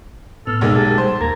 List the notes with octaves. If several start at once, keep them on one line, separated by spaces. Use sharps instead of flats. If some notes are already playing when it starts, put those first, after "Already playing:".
A2 B3 A4 F6
B1 A#2 G#3 A4
A#3 G4 G#4 A5
G3 C5
D#2 A#3 A#5 G#6